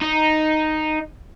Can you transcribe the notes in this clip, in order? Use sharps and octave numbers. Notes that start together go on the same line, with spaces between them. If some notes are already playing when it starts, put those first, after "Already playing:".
D#4